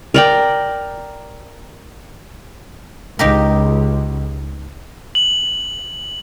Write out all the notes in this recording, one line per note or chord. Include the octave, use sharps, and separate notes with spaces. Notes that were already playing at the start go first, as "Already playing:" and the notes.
A#4 D5 G5
C#2 D#4 G4 A#4
F#7